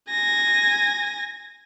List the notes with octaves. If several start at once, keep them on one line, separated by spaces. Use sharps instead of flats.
G#5 A#6